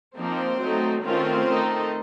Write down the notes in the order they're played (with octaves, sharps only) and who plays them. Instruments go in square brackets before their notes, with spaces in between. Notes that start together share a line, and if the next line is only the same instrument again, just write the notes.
[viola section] F3 A#3 C4 D#4 C5
F#3 A3 D#4
D#3 A3 C4 C#4 F4 C5
D#3 A3 D#4